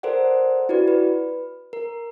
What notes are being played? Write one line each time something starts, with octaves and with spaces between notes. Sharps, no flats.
A4 A#4 C5 D5 F#5
E4 F#4 G4 B4 D5
B4
A#4